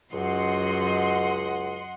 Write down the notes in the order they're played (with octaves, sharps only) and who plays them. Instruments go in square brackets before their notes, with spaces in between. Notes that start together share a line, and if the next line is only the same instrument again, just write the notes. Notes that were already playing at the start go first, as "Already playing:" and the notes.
[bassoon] C#2 [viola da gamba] F#2 [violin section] D#5 F#5 C6